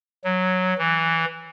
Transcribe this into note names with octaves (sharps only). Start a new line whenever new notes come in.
F#3
E3